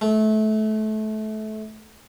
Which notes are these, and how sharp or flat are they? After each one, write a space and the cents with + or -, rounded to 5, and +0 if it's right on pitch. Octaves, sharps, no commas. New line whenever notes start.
A3 -25